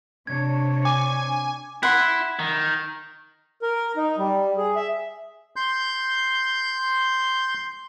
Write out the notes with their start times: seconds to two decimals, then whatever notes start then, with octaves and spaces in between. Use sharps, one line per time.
0.27 C3 D4 C#5 G#6
0.85 G#5 D6
1.83 E4 F#5 C6
2.39 D#3
3.62 A#4
3.97 D#4
4.18 G3
4.57 G#4
4.76 E5
5.56 C6 G6